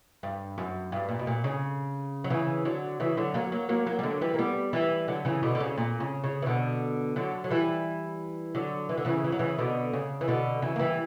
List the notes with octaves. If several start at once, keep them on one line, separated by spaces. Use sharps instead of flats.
G2
F#2
G2
A#2
B2
A#2
C#3
F#3
C#3 E3
D3 F#3
C#3 E3
D3 F#3
F#3 A#3
F#3 A#3
F#3 A#3
F#3 A#3
G3
D3 F#3
E3 G3
A#3
G3 B3
E3 G3
D3 F#3
C#3 E3
B2 D3
D3
C#3
A#2
C#3
C#3
E3
B2 D3
D3 F#3
F#3
E3 G3
D3 F#3
E3
D3
C#3 E3
E3
F#3
C#3 E3
B2 D3
C#3
E3
B2 D3
C#3 E3
A#3
E3 G3